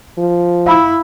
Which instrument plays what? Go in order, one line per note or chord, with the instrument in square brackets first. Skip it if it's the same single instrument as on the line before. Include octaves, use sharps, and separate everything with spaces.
[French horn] F3
[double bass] E4 [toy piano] F5 B5 E6